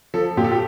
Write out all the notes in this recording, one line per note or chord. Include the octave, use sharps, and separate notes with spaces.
F3 A4
A#2 G4
A4
G4